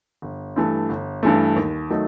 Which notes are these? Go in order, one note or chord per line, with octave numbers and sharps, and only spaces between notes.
G1
G2 E3 A3
G1
G2 E3 A3
D#2
D#3 F#3 A3 D#4